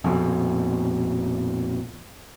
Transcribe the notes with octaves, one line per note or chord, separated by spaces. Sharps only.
A#1 F2 B2